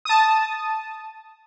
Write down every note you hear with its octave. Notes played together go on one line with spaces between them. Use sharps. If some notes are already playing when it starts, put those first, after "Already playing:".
A5 D#6